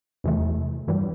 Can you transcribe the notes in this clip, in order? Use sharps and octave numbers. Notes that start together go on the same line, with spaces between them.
E2 C3 E3 A3
G2 E3 G3